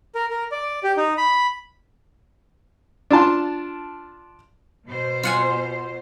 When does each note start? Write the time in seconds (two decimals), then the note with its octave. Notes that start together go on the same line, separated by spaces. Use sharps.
0.15 A#4
0.30 A#4
0.52 D5
0.83 G4
0.97 D#4
1.18 B5
3.11 D4 F4 A5 C6
4.88 B2 C5
5.23 F4 F#5 G#5